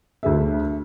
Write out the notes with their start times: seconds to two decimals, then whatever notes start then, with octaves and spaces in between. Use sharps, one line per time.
0.23 D2 G#4 E5